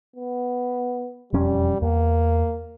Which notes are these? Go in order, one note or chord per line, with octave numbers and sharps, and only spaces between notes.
B3
E1 F2 G3 C#4
E2 A#3